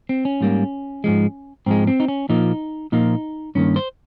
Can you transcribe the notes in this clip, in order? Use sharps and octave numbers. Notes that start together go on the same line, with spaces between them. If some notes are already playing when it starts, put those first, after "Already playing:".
C4
C#4
G#2 G3 A#3
G#2 F3 G#3
G#2 F3 G#3 C4
C4
D#4
C#4
A#2 F3 A#3 D#4
A#2 F3 A#3 D#4
G2 D#3 A#3 C#4
C5